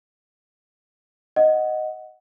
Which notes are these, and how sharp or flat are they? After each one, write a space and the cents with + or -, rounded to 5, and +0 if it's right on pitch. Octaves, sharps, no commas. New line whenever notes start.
D#5 +0 F#5 +0